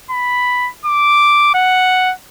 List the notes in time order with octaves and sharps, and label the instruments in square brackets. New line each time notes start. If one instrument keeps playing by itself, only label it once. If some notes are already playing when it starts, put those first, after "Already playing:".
[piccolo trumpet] B5
D6
F#5